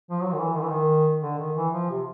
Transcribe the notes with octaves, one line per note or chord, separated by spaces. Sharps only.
F3
F#3
D#3
E3
D#3
E3
D#3
D3
D#3
E3
F3
C3